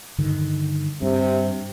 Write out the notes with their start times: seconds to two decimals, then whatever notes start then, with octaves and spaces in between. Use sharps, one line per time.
0.18 G2 D3 D#3
1.02 G2 C3